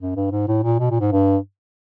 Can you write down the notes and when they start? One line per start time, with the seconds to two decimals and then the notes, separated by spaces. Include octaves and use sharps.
0.01 F#2
0.16 G2
0.31 G#2
0.48 A2
0.63 A#2
0.79 B2
0.91 A#2
1.00 G#2
1.12 G2